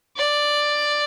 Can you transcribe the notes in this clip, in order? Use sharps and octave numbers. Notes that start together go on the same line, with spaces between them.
D5